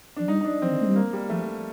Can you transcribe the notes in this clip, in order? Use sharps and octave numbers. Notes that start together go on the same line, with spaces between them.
F3 D4
G3 D#4
D#4
D4
F3 C4
D#3
A3
G3
A#3
G3
F3 A3